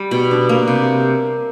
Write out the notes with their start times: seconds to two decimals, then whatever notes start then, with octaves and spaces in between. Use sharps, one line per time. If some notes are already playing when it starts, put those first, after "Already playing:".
Already playing: G3
0.11 B2
0.31 D4
0.49 A#3
0.68 C3